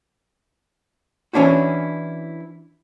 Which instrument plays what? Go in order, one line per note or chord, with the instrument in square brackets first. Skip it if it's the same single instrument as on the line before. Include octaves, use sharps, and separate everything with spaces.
[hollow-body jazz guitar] E3 C#4 D4 E4 F#4